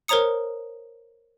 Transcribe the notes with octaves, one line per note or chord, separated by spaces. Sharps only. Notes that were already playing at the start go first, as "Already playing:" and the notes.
A#4 C5 C#5 A#5 D#6 C#7